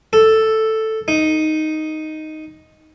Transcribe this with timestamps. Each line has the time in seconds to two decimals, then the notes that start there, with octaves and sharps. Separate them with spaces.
0.13 A4
1.08 D#4